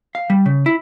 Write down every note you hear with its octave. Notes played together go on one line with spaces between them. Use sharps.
F5
G3
C#3
E4